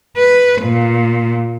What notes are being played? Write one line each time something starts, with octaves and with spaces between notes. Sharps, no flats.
B4
A#2